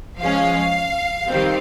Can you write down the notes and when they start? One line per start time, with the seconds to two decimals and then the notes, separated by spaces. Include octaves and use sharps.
0.19 F3 G#3 C#4 F5
1.27 D#3 G3 C4